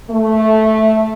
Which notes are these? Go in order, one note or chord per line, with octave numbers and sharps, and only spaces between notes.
A3